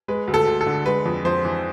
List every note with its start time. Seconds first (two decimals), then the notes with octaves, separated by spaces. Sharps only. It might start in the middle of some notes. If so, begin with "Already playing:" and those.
0.08 G#3 B4
0.28 D2
0.34 A4
0.47 D2
0.61 A4
0.67 D3
0.86 G#3 B4
1.05 F2
1.25 F2 C5
1.45 E3